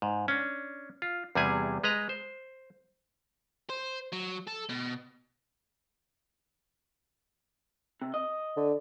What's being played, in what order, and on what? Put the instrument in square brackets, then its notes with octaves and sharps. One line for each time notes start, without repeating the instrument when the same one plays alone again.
[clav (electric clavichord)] G#2
C#4 D4
F4
E2 C3 G3 E4 G#4 G#5
G#3 B4 D#5 A#5
C5
[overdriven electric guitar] C5
F#3
A4
B2
[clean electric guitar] C3
D#5
[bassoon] D3